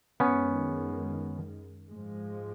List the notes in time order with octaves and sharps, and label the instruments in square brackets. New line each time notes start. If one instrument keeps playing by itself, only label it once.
[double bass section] F#2 D#3 G#3 [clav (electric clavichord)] B3 C#4
[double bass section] G#2 F3 G#3